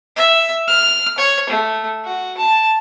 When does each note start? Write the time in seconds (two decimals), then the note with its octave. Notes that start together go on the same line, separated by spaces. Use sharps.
0.16 E5
0.68 F6
1.18 C#5
1.50 A3
2.04 F#4
2.38 A5